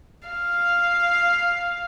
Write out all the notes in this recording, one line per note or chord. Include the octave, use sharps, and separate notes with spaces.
F5